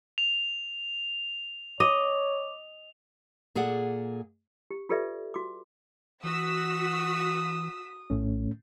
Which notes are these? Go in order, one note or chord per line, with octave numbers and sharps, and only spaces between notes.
F7
C#5 D#5 D6
A#2 G#4 A4 D5 F#5
G4
F4 G4 A4 B4 D5 E5
F#4 D6
E3 F#4 D#6 E6 B6
A#1 A2 A3 C#4